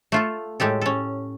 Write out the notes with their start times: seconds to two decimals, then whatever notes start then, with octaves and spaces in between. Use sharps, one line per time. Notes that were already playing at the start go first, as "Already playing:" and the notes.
0.12 A3 F4 A4
0.60 A2 G#3 G4 A4
0.81 C#4 A4